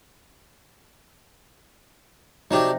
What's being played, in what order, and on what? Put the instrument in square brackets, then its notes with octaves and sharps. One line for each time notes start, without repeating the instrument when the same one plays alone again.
[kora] C3 D#4 [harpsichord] F#3 D4 G4